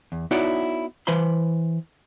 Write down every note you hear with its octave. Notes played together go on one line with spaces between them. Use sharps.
E2
B3 D#4 E4 F#4 C#5 D5
E3 B4 C5 B5 C6